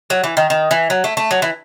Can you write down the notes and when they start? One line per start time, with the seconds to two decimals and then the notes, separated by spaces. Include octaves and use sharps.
0.10 F#3
0.24 E3
0.37 D#3
0.50 D#3
0.71 E3
0.90 F#3
1.04 A3
1.17 A3
1.31 F#3
1.42 E3